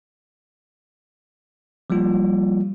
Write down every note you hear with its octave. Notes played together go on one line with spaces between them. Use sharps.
F3 G3 A#3 F4